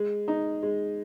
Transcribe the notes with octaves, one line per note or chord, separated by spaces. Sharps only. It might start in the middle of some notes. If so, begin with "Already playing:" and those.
Already playing: G#3
D#4
G#3